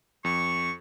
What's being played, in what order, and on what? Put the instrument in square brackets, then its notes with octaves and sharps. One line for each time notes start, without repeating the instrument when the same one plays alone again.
[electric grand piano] F2 [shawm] C#6